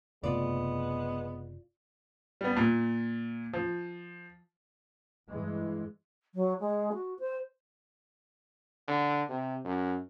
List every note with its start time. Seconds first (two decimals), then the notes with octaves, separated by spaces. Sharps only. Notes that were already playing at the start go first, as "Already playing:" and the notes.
0.24 F#1 C3 G#3 A3 B3 F4 D5
2.41 G3 B3
2.57 A#2
3.53 F3
5.28 G2 E3 G#3
6.35 F#3
6.60 G#3
6.93 F#4
7.19 C5
8.88 D3
9.29 C3
9.65 F#2